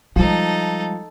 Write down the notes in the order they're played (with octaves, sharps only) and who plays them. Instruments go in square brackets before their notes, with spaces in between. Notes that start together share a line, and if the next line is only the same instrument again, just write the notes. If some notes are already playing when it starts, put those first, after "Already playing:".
[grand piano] F3 [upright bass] G3 G#3 [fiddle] D#4 A4